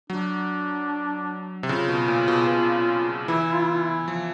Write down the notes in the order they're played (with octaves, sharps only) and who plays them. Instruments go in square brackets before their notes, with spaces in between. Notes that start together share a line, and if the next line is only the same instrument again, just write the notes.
[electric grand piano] F#3 [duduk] D4
[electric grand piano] C3
[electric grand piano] C#3 [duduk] F4
[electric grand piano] B2
A#2
B2
B2
[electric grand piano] E3 [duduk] E4
[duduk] F4
E4
F4
E4
[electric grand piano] F3